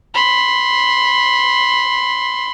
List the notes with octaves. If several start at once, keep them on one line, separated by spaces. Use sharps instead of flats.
B5 C6